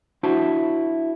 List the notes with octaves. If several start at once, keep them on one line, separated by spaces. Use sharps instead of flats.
D4 E4 F#4 C5 E5 A5